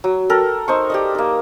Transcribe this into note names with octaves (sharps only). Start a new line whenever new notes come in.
F#3
A4 A#4 G5
D#4 C5 C#6
G4 D5 D#5
A#3 D#4